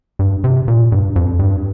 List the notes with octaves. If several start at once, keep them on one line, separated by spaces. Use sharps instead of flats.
G2
C3
A#2
G2
F2
G2